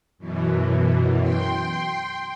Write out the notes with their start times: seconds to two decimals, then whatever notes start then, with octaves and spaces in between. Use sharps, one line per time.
0.18 F#2 B2 E3
1.21 G5 C6